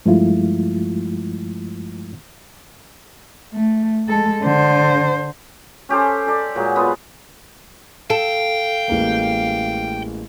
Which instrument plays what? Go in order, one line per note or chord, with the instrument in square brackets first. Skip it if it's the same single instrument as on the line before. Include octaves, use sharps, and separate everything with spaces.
[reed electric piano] G2 F3 G#3 A3 E4 F4
[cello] A3
G#3 A4
D3 C5
[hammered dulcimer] C#4 G4 A4 C5
A4 D5
A#2 F#3 G#3
B3 F4 D#5 B5
[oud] A4 [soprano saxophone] F5 [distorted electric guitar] G5
[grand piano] A1 G#3 A#3